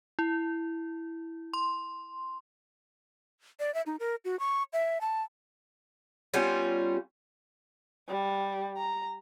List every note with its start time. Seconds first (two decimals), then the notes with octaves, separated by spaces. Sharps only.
0.19 E4
1.53 C6
3.60 D5
3.74 E5
3.86 D#4
4.00 A#4
4.25 F#4
4.39 C#6
4.73 E5
5.01 A5
6.34 G3 B3 C#4 F4
8.08 G3
8.77 A#5